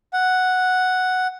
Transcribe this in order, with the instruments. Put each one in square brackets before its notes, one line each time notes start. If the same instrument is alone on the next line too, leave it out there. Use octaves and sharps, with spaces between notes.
[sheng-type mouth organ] F#5